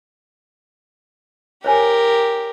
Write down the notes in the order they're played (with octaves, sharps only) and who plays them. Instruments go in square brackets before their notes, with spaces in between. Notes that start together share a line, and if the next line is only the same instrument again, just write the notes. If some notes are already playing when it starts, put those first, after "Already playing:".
[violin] G4 A#4 [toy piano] C5 C#5 G#5